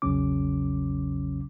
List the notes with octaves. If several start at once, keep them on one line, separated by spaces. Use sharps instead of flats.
A#1 E2 C#3 F#3 C#4 D6